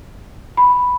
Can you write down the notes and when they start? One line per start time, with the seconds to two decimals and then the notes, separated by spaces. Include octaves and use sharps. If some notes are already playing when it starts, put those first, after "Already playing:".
0.57 B5